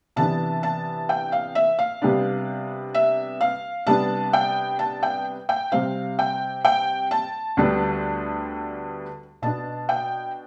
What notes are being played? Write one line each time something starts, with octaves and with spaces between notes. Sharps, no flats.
C3 E3 B3 D4 A5
A5
G5
F5
E5
F5
C3 G3 B3 D4
E5
F5
C3 G3 B3 D4 A5
G5
A5
G5
G5
C3 G3 C4 F5
G5
G5
A5
D2 D3 G3 B3 D4
B2 B3 D4 A5
G5